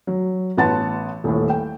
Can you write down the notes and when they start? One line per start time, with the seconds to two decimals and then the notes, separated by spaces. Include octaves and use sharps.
0.07 F#3
0.57 A1 B3 F#5 A5 C6 A6
1.24 D#1 A2
1.50 G5